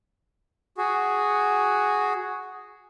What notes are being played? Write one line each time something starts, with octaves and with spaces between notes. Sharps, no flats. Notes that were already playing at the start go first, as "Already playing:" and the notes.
F#4 G#4